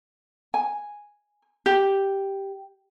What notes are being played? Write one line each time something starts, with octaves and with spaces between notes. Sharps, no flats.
G#5
G4